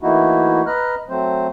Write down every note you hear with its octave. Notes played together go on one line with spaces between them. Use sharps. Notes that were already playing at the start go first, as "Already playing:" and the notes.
E3 A3 A#3 D#4 E4 F#4
B4 D#5 A#5 F6 F#6
F#3 A3 C4 C5